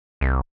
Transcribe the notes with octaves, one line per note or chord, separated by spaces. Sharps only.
C2